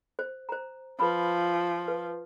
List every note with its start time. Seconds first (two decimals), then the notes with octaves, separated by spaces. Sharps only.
0.19 C5
0.49 C5 A#5
1.00 F3 B4 B5
1.88 B4